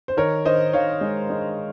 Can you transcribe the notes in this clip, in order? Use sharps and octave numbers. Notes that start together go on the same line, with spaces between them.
C5
D#3 A#4 C#5
D#3 C5 D#5
D#3 C#5 F5
G#3
G#3